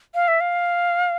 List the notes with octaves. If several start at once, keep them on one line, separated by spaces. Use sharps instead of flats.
F5
E5
F5